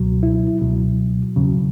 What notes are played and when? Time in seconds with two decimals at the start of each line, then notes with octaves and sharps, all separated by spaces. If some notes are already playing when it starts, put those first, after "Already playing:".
Already playing: C#2 B2 F#3
0.23 E4
0.61 C#2 B2 F#3
1.36 E2 C#3 F#3